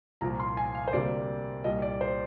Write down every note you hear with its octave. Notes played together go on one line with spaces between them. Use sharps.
C2 A#2 F3 A#5
C6
G#5
F5
C5
D2 C3 G3 A#3 D5
C2 A#2 G3 D#5
D5
C5